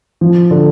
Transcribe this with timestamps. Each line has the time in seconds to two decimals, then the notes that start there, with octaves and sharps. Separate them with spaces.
0.21 F3
0.51 D3